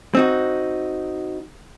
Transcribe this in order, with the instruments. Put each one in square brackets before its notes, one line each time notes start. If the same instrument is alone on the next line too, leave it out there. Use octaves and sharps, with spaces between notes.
[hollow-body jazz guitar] C4 D#4 F#4